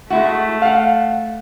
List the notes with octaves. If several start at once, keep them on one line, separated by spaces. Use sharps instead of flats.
G#3 A3 E4 F#4
F5 F#5